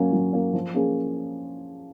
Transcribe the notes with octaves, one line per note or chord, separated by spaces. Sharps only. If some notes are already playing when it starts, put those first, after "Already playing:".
Already playing: F#3 A#3 C#4
F#3
A#3 C#4
F3
A#3 C#4 G#4